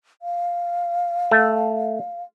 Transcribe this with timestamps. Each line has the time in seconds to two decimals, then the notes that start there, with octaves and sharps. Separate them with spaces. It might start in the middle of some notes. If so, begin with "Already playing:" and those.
0.22 F5
1.31 A3